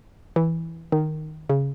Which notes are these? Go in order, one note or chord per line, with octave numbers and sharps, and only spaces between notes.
E3
D#3
C#3